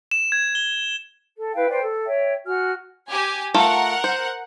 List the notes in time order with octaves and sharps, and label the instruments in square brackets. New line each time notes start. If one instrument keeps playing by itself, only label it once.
[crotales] E7
G#6
G7
[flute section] A4
E4 B4 F5 G5
B4 C5 D5 G5
A4
C#5 E5 G5
F#4 G#5 F6
[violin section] G4 G#5
[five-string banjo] A3 F4 A4 [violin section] A#4 F#5
[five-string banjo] C5